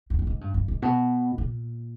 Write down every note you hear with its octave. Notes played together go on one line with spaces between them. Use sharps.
E2
G2
G#2
G2
G2
G#2
B2
A#2